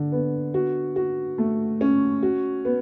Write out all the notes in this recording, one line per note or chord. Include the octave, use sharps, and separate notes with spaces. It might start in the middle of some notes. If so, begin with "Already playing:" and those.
Already playing: D3
B3
F#4
F#4
A3
C#4
F#4
B3